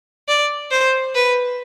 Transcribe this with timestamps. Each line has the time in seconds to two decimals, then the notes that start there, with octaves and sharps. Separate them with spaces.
0.28 D5
0.71 C5
1.15 B4